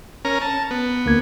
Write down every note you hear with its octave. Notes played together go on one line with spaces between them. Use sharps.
C#4 A#4 A#5
A5
B3
D2 A#3 G#6